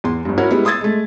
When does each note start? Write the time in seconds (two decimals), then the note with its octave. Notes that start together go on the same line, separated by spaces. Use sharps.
0.04 E2 C6
0.25 G1 G2
0.38 C#4 E4 F#4 A#4
0.51 G3 G#3 B3 E4
0.65 C6 D#6 E6 G#6 A6
0.81 G#3 A3